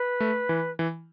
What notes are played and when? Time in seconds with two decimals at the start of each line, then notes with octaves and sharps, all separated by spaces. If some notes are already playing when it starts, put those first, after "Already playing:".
Already playing: B4
0.20 A3
0.49 E3
0.79 E3